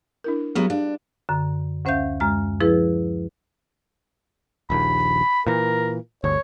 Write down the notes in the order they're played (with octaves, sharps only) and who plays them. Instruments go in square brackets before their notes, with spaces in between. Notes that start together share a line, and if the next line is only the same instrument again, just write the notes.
[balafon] D4 E4 A#4
[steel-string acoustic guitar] F#3 B3 [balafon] G3 G4 G#4
[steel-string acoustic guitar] D4 [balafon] F5
[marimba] F#2 D3
D2 C#4 C5 E5 F5 G6
F#2 G#3 F6
F3 E4 G#4 B4
[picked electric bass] D#1 A#1 D#2 [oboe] B5
[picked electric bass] A#2 E3 [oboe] A#4
[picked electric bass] G1 D2 [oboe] C#5